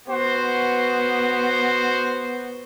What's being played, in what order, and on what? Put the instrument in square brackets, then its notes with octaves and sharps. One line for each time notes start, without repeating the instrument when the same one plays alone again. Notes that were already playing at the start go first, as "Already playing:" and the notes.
[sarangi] B3 [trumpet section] F#4 C5